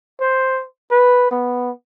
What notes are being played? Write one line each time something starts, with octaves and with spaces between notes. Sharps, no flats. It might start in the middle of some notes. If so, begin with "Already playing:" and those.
C5
B4
B3